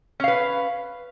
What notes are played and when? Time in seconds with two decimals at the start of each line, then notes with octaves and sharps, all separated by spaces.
0.20 C#4
0.24 F5
0.28 B4